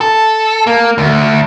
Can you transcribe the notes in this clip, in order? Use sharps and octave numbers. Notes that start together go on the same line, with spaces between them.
A4
A#3
D2